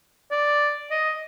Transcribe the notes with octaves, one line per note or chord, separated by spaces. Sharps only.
D5
D#5